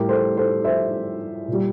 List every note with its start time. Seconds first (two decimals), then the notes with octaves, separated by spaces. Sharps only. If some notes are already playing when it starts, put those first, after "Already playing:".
Already playing: A2 G3 G4 A#4
0.09 A4 C5
0.37 A4 C5
0.64 C5 E5
1.48 A#2 G3